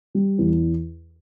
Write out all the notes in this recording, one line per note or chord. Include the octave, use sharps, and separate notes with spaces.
G3
E2